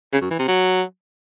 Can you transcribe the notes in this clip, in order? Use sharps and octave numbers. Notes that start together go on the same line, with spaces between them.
C#3
F#2
E3
C3
F#3